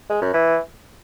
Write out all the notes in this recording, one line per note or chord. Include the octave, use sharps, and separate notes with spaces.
G#3
F#2
E3